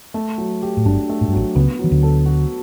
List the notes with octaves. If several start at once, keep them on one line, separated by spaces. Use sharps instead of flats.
A3
F#3
G4
A2
G1 G2 D4
A3
A2
G2
A1 A2 F#3
C#2 C#3 B3
E3 F#3
D2 D3
A4
F#4